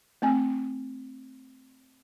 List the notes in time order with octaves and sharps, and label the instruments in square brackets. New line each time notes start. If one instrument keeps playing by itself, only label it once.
[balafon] A3 C4 G#5